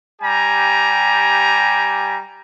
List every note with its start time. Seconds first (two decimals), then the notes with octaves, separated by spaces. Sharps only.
0.22 G3 G4 G#5 A#5